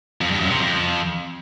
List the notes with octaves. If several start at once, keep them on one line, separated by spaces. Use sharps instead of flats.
F2
G2
F#2
C3
F2